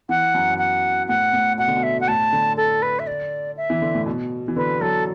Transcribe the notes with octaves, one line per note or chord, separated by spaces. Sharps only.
E3 F#5
F#2
F#2
F#5
A2 F#5
A2
B2 F#5
D3
B2
E5
F#5
A2 A5
D3
A4
B4
E5
D5
E5
E3
D3
A2
B2
E3
D3 B4
F#3 A4